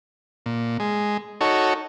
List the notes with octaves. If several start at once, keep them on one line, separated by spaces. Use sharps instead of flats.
A#2
G#3
D#4 F#4 A4 C#5